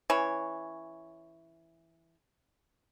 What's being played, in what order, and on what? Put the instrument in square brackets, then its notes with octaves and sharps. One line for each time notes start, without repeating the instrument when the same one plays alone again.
[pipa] E3 C#4 C#5